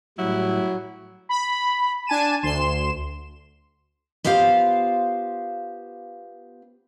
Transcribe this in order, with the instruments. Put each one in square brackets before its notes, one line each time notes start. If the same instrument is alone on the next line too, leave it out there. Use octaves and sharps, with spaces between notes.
[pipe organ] A2 G3 [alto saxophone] F#3 [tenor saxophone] E4
[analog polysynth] B5
D4 G#5 A5 D#7 E7
D2 C6 E7
[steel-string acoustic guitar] B3 F4 G4 C5 F5